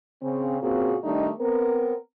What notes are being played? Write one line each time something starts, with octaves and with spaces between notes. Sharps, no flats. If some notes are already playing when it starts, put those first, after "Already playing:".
C#3 C4
A#2 C#3 A#3 C4 F#4 G#4
D#3 G3 A3 D4 D#4
B3 C4 A#4